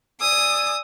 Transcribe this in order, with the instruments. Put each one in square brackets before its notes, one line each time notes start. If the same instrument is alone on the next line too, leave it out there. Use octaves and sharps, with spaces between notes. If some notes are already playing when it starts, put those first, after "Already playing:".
[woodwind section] D5 G#5 E6 [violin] D#6